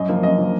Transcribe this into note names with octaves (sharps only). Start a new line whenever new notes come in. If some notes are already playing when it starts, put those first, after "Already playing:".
Already playing: F#2 D#5
F3 A#3
F#2 D#5
F3 A#3